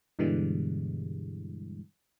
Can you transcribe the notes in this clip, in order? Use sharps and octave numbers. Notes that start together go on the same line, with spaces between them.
G2 B2 D3 E3 G3 G#3